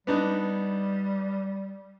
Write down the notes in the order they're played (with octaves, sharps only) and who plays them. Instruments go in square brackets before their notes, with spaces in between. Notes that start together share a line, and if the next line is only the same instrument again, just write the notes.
[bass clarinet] G3 [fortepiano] B3 D4 D#4